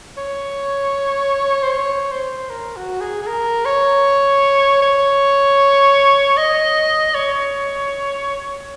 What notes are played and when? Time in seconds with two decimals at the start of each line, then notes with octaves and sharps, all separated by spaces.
0.17 C#5
1.63 C5
1.72 C#5
2.11 C5
2.49 A#4
2.76 F#4
3.01 G#4
3.22 G#4
3.27 A#4
3.65 C#5
4.82 C#5
6.37 D#5
7.15 C#5